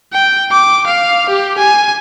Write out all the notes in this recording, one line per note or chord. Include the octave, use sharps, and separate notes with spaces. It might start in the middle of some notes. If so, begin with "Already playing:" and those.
G5
D6
F5
G4
G#5